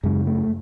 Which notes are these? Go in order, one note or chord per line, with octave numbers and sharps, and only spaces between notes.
F#2 C#3 G#3
A3